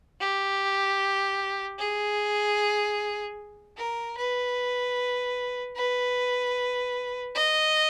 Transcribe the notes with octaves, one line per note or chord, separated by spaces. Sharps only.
G4
G#4
A#4
B4
B4
D#5